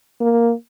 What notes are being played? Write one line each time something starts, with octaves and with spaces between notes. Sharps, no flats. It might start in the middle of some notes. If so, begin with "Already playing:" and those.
A#3